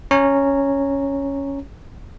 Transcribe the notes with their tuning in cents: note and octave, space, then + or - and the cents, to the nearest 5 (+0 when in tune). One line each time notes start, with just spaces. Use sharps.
C#4 +0 C#5 +0 A#5 -15